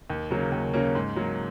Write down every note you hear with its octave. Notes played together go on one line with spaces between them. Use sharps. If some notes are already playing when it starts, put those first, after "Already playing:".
D#2
C#3 F#3 A#3 C#4
D#2
C#3 F#3 A#3 C#4
G#2
F#3 A#3